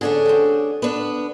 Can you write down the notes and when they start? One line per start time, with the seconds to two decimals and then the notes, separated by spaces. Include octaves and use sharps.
0.01 D3 A3 C#4 D4 G#4
0.25 C4 F#4 G4
0.82 B3 D4